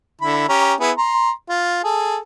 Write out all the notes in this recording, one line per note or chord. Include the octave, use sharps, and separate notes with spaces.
D3 E4 B5
C#4 G4 A#5
B3 E4 G#4
A#5 C6
F4
G#4 A4